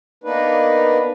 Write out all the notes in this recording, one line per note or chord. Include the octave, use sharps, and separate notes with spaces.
A#3 B3 D4 D#4 B4